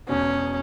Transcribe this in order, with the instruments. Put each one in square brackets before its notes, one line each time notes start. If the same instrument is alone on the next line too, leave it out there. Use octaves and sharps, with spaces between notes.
[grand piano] E1 E2 B2 [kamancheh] C#4